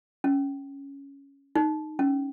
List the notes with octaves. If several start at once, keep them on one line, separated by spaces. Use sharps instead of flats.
C#4
D#4
C#4